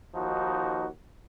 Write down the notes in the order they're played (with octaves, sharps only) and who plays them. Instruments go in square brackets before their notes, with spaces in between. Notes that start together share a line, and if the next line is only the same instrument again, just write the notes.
[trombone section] D#2 F3 D#4 F#4